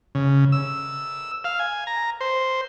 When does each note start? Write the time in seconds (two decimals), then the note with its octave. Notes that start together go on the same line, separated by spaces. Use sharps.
0.15 C#3
0.52 E6
1.44 F5
1.59 G#5
1.87 A#5
2.21 C5